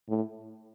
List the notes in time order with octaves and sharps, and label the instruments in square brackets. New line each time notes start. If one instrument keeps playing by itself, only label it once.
[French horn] A2